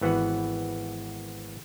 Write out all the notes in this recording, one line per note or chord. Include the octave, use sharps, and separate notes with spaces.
G#1 E3 B3 F#4 F#5